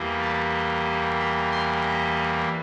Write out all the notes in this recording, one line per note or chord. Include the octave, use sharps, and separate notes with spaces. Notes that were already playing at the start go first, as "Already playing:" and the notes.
Already playing: E2 E3 G3 A#3
D5
E5
C6
A#5